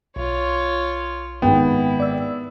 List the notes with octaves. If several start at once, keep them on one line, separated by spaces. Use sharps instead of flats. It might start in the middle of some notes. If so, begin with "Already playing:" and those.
B1 F4 C#5
G#1 B3 E4 G5
D5 E6